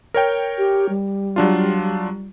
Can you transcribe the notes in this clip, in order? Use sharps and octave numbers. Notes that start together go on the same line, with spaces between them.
A#4 C#5 G5
G4
G3
F#3 D4 F4